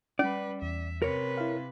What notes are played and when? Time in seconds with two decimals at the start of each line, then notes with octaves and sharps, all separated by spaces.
0.19 G3 C#4 B4 D5
0.62 E2 E5
1.02 C3 A#4 B4 C#5
1.37 E4 F5